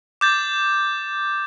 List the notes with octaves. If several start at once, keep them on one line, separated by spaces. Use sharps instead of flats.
D6 G6 A6